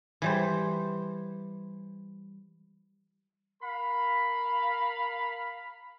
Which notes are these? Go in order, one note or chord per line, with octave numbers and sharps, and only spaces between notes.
E3 G3 C5
A#4 F5 B5